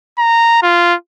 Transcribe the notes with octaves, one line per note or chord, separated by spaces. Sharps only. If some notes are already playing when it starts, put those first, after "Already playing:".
A#5
F4